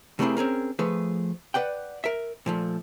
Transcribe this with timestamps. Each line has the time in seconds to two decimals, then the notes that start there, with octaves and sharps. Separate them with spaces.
0.19 C3 A3 A#3 C4 E4 G#4
0.37 C4 C#4 G#4 A#4
0.79 F3 A3 G#4 B4
1.54 B4 D5 F#5 G5
2.04 A#4 E5
2.46 A#2 F3 A3